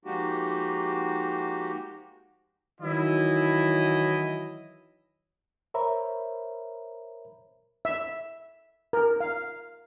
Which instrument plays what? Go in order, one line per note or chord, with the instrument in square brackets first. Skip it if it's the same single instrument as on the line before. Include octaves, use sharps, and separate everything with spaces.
[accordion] F3 G#3 A#3 D#4 F#4 G4
[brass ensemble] D#3 E3 F#3 E4 D#5
[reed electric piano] A#4 C5 C#5 E5 A#5 B5
[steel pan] E5
A#4
F5